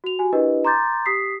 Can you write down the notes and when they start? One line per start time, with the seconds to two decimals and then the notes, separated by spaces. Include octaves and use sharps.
0.04 F#4 F7
0.19 F#4 G4 G#5
0.33 D4 E4 G4 A#4 B4 D#5
0.65 A#5 C6 D6 G6 A6
1.06 G4 D#6 B6 C7